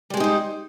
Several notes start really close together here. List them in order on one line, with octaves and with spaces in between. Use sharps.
G3 G#3 G4 D#4 C5